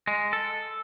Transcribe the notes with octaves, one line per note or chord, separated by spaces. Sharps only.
G#3
A4